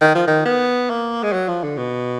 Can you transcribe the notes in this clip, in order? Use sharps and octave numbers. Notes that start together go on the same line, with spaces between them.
D#3
F3
D#3
B3
A#3
G#3
F#3
F3
D3
B2